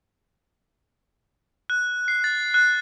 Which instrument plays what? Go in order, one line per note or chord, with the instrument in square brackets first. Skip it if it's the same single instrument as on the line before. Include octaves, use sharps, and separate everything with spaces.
[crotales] F#6
C7
A6
F#6